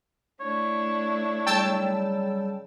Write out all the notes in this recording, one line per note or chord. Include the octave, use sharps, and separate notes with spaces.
A3 D4 E4 C#5
C#3 F#3 G3 G5 A5 E6